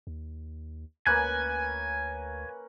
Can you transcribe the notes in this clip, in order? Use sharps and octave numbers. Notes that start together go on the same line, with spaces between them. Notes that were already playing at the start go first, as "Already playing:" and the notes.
D#2
D2 A#3 C#4 B4 G#5 F#6 G#6